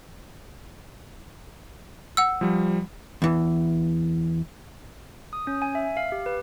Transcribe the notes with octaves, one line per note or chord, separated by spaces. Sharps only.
F#5 E6
F3 G3
E2 E3
D#6
C#4
G#5
E5
F5
G4
B4